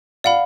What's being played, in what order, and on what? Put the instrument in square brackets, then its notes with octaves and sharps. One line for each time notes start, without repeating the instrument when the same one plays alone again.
[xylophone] D5 F#5 B5 [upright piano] F5